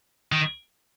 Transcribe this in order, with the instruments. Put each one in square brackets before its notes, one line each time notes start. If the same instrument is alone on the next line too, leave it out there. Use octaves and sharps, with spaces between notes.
[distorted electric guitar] D#3